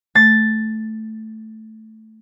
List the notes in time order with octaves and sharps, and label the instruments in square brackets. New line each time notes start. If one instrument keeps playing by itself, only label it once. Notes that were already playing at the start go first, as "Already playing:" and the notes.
[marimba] A3 [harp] A6